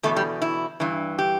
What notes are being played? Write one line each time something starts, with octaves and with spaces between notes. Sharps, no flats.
E2 B2 A3
G3
E4
G2 E3
G4